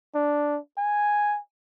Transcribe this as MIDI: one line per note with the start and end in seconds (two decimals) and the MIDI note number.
0.15 0.58 62
0.78 1.39 80